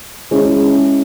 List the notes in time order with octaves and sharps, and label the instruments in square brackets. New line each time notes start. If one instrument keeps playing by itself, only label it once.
[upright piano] G#3 C#4 E4